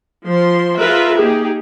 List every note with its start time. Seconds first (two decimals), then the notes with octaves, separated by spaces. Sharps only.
0.24 F3 C6
0.77 F4 G#4 A#4 B4 E5
1.19 A#3 D#4 G4 G#4